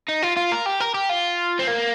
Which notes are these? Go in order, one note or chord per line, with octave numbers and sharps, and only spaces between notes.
D#4
F4
F4
A#4
G4
A#4
G4
F4
C4
A#3